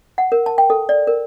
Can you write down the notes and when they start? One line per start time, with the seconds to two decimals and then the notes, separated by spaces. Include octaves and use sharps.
0.18 F#5
0.32 A#4
0.46 A5
0.58 G5
0.70 A4
0.89 D5
1.07 A#4